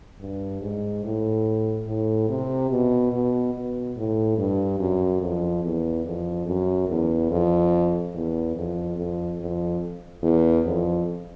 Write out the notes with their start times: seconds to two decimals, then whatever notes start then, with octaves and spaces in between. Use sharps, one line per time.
0.20 G2
0.62 G#2
1.04 A2
1.87 A2
2.29 C3
2.71 B2
3.12 B2
3.54 B2
3.96 A2
4.38 G2
4.79 F#2
5.21 F2
5.63 E2
6.05 F2
6.46 F#2
6.89 E2
7.30 F2
8.14 E2
8.56 F2
8.97 F2
9.40 F2
10.23 E2
10.65 F2